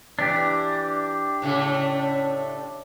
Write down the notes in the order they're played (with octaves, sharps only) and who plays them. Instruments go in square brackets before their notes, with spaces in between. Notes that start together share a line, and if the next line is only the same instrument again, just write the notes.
[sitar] E3 [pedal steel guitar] D4 G4
[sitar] A2 C#3 A3